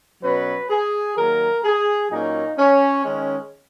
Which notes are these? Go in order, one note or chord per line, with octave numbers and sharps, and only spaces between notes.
B2 F#3 C#4 B4
G#4
D#3 F#3 A#3 A#4
G#4
A#2 F#3 A#3 C#4 D#4
C#4
D#3 G#3 C#4